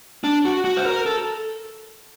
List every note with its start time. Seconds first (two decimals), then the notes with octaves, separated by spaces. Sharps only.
0.24 D4
0.45 F#4
0.65 F#4
0.77 C5
0.86 A#4
1.06 A4